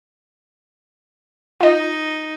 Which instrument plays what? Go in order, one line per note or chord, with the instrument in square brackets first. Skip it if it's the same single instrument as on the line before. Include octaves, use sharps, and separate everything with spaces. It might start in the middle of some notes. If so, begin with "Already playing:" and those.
[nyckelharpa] D#4 [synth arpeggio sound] F4 D#5